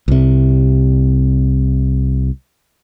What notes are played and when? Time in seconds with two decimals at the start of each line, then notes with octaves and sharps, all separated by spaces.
0.08 C2 C3